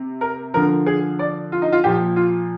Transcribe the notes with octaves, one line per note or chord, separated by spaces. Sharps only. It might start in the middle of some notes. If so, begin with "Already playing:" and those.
Already playing: C3
A#4
D3 F3 A#4
G#4
D5
F4
D#4
F4
A#2 F3 G4
F4